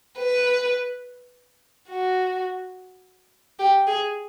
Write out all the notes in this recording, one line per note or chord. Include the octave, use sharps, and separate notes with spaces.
B4
F#4
G4
G#4